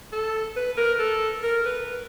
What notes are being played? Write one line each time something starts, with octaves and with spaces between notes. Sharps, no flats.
A4
B4
A#4
A4
A#4
B4